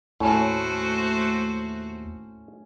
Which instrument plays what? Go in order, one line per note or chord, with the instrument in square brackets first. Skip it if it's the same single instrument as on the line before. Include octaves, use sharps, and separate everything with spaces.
[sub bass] D#2 [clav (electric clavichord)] A2 [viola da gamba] A3 F#4 C5 [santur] C#4